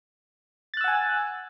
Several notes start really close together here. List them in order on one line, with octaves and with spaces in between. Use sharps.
A6 F#6 E6 F#5 G#5